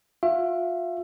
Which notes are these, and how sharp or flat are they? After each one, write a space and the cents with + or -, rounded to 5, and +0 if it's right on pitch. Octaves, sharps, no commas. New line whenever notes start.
F4 +35 E5 +30